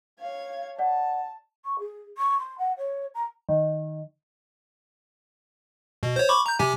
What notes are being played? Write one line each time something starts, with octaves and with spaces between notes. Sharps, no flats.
C#5 F5 G#6
D5 F#5 A5
C#6
G#4
C#6
C6
F#5
C#5
A#5
D#3
B2
C5 C#5
B5 C#6 D6
A#5 G6
C3 G4 G#5